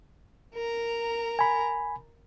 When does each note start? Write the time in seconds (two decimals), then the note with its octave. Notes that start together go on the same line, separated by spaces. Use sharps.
0.54 A#4 A#5
1.39 G#5 B5